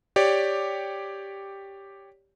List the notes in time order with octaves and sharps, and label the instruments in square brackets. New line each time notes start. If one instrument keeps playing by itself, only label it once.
[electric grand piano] G4 C#5 D5